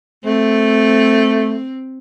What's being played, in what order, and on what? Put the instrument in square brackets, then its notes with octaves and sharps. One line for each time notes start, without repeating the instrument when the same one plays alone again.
[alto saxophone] A3 [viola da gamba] C4